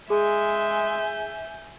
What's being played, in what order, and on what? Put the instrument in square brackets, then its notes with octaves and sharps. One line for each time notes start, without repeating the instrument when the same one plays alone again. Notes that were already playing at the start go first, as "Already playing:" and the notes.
[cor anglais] G#3 [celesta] G#4 [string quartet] E5 [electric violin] G#5 G6